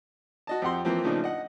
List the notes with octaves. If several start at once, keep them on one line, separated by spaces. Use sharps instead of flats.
F#4 D#5 A5
F2 G4 F#5 C6
E3 F3 A#3 C4
A2 C#3 F3 A#3 D4 D#4
D#5 F#5